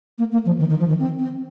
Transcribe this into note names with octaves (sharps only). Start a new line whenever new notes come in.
A#3
A#3
F3
D#3
D#3
F3
D#3
C4
C4